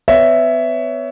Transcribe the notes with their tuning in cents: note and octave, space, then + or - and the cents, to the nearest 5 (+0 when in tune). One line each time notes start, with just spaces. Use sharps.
B3 +35 C#5 +25 E5 +5